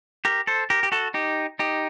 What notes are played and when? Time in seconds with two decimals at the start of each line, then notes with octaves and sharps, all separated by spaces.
0.25 G4 A#4
0.47 A4 C5
0.70 G4 A#4
0.83 G4
0.92 F#4 A4
1.14 D#4 G4
1.59 D#4 G4